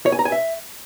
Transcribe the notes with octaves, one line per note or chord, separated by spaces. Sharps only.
C#5
G#5
A#5
G#5
E5